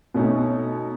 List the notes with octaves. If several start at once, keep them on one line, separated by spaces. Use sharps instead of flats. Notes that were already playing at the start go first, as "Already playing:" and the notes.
B2 A3 C#4 D#4